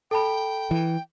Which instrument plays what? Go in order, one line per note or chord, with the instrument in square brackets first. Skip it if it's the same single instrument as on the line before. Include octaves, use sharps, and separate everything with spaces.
[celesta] A4 A5 B5 [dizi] G5
[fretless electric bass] E3